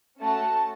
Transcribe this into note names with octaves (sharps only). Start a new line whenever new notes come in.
A3 C#4 F#4 A5